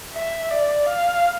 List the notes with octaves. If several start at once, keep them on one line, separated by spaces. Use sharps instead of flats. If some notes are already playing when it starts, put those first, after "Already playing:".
E5
D5
F5